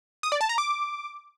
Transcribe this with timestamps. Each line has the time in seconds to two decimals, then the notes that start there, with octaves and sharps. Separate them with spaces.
0.23 D#6
0.32 D5
0.41 A5
0.49 A#5
0.58 D6